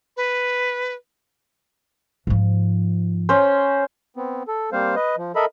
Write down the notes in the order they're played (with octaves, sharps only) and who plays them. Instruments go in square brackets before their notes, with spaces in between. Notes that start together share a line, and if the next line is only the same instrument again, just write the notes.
[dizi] B4
[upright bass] G#2 F3
[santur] C#4 C5
[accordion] B3 C4
A4
G3 A#3 C4 C5 F5
B4 D#5
F3
A4 A#4 D#5 E5 B5